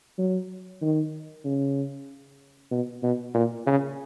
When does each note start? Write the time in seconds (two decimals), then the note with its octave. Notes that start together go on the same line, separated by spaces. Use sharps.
0.18 F#3
0.82 D#3
1.45 C#3
2.71 B2
3.03 B2
3.34 A#2
3.66 C#3